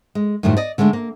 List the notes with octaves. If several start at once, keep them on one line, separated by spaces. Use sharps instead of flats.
G#3
F#2 A2 D#3 F3 G3
D5 D#5
D3 G#3 A3 C#4 D4
A#3